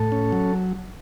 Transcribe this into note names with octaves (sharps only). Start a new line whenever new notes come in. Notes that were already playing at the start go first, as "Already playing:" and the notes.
Already playing: A2 A4
C#4
F#3